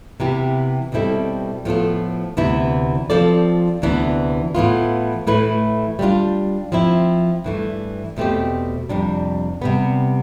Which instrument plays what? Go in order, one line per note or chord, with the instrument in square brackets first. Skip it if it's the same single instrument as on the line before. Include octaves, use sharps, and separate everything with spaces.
[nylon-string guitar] C3 E3 B3 E4 G4
B2 G3 C4 E4 A4
A2 F3 B3 F4 A4
D2 C3 E3 B3 E4
F3 C4 F4 A4 D5
D2 C3 E3 B3 D4
A2 E3 B3 F4
A2 E3 A3 E4 B4
G3 B3 D4 F4
F3 C4 E4
G2 E3 A3
E2 B2 A3 C4 G4
F2 C3 G3 D4
C3 G3 B3